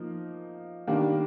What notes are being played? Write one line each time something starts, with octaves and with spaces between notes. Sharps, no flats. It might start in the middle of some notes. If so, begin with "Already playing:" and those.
Already playing: F3 A#3 D#4
D#3 G3 A#3 D4